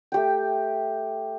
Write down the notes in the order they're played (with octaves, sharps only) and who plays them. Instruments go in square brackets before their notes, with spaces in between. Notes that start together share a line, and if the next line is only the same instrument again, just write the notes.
[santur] A3 G4 G5